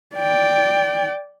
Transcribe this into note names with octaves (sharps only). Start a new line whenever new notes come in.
D5 G5